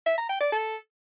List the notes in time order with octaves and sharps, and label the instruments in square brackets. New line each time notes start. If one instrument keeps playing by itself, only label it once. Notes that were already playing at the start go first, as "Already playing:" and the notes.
[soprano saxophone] E5
A#5
G5
D5
A4